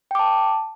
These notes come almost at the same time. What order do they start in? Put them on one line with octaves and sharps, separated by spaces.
G5 D6 A5